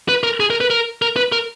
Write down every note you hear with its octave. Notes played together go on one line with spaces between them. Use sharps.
B4
A#4
G#4
A#4
B4
A#4
A#4
B4
A#4